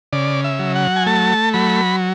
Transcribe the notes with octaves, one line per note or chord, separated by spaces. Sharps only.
C#3 D5
E5
F#3
F#5
G#5
A3 A5
F#3 B5